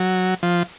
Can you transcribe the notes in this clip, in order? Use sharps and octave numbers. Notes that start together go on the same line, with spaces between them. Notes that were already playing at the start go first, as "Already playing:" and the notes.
Already playing: F#3
F3